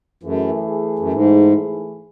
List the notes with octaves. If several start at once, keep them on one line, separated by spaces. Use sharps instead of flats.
F#2 E3 A3 E4 G#4
F#2
G#2